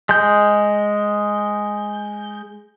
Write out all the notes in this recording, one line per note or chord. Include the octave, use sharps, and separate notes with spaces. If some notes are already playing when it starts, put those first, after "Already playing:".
G#3 G6